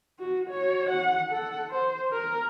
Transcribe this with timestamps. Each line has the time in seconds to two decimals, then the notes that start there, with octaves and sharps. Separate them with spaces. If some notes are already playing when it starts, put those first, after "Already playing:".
0.19 F#4
0.50 F#4 C#5
0.90 F#5
1.29 A4 F#5
1.70 C5
2.12 A#4